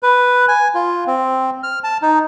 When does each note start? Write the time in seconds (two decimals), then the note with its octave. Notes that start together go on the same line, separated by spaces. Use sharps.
0.03 B4
0.48 G#5
0.75 F4
1.07 C4
1.63 F6
1.84 A5
2.02 D#4